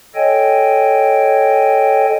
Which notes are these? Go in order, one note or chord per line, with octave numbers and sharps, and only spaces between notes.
A4 C#5 D#5 G5 G#5